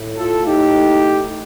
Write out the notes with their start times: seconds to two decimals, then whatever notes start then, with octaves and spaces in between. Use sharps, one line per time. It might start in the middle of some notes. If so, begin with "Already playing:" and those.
Already playing: A2 A3
0.17 F4 A4
0.46 D#4 G4